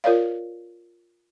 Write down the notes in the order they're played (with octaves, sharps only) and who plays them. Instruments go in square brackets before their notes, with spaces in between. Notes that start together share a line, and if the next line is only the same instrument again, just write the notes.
[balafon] F4 A#4 C#5 D5 F5